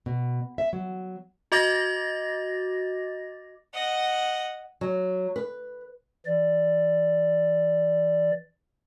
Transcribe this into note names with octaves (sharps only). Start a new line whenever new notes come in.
B2
E5
F#3
F#4 D#5 D6 A6 A#6
D#5 F#5
F#3
B4
E3 D5